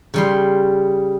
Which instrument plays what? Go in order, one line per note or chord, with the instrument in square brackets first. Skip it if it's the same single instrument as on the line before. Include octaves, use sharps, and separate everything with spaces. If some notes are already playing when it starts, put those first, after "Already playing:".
[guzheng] C#3 G3 C6